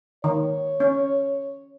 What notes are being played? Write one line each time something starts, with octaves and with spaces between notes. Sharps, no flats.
D#3 C#5
C#4